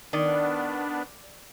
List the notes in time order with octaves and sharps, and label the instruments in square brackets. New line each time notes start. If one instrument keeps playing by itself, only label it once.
[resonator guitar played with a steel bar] D#3 [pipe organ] B3 D4 [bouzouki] D5